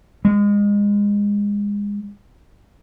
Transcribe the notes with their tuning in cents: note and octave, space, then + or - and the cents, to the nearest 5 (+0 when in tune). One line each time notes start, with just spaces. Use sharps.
G#3 -25